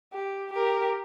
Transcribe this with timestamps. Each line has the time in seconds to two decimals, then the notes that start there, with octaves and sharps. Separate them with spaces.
0.13 G4
0.53 G4 A#4